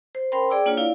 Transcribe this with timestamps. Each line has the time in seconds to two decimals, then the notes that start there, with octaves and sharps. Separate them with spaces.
0.15 C5
0.32 C#4 A#4 C5 G5 B5 C6
0.50 G#4 D5 G5 D6 E6
0.66 A#3 D4 F4 C#5 F#5
0.77 E4 D5 F5